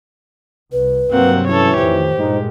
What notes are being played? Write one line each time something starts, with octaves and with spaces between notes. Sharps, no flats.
C2 B4
G2 C3 F#3 A#3 C4 F#5
E3 C#4 A4 C#5
F2 A2 D#3 G4 C5
G2 A#2 G#3 D#4